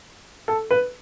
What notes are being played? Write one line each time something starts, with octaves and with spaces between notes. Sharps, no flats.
A4
B4